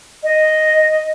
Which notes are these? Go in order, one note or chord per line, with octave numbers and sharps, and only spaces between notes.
D#5